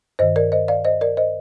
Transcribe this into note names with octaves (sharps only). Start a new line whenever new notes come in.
G2 D#3 C5 D#5
A#4 D5
C5 D#5
D5 F5
C5 D#5
A#4 D5
C5 D#5